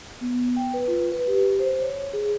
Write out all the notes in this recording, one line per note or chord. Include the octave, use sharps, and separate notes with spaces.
B3
G5
B4
F4
B4
G4
C5
C#5
G#4